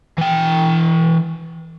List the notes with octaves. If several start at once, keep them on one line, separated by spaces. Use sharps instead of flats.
E3 G5